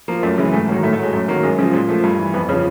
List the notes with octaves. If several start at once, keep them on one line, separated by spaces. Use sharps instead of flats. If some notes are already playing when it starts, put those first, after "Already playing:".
F3 A#3
F#2 A3
C#3 E3 G#3
G#2 A3
D#3 F#3 A#3
A2 A3
A3
F#3 G#3
F#2 A3
D#3 F#3 A#3
F#2 G#3
C#3 F3
A#2 G#3
F3 A3
G2
E3
F2 B3
C#3 F3 C#4